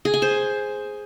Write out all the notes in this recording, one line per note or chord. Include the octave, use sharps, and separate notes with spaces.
G#4
G#5
C5